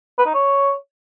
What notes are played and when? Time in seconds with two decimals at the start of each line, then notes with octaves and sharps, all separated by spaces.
0.18 B4
0.26 D#4
0.34 C#5